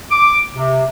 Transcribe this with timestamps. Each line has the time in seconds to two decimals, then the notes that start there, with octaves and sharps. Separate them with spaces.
0.11 D6
0.55 C3